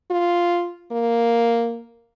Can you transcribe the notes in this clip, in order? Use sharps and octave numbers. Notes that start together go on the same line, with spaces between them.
F4
A#3